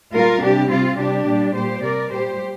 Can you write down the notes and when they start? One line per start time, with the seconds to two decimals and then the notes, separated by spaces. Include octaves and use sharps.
0.13 A#2 G3 F4 A#4
0.42 C3 G3 D4 G4
0.70 C3 G3 C4 F4
0.98 C3 G3 D4 G4
1.27 A#2 G3
1.54 A#2 G3 G4 C5
1.82 C3 G3 A#4 D5
2.11 A#2 G3 G4 C5